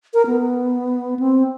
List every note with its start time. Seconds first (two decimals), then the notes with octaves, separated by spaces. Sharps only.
0.14 A#4
0.27 B3
1.20 C4